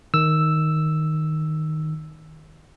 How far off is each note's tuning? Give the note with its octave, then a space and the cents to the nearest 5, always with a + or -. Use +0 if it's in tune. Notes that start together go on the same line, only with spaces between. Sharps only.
D#3 +0 E6 +0